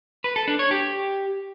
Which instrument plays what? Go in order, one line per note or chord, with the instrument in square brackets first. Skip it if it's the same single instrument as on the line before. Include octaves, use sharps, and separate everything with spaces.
[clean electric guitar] B4
A4
D4
C#5
G4